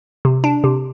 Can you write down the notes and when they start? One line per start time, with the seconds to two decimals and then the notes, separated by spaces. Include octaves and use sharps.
0.25 C3
0.44 D4
0.64 C3